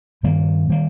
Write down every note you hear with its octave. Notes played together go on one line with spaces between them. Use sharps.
G2 D#3 G3 A#3
D#3 G3 A#3